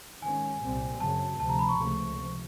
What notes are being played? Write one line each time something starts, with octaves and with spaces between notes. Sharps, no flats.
G#2 D#3 G#3 C#4 G#5
C2 A#2 G3 C4
F#2 C#3 F#3 A5
D2 C3 F3 A5
A#5
B5
C#6
C#2 C3 F3 A3
C3 F3